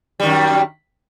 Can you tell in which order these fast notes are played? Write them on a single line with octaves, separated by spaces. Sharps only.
G3 D#3 F#2